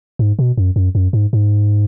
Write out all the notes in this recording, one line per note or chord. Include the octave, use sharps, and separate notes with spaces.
G#2
B2
F#2
F#2
F#2
G#2
G#2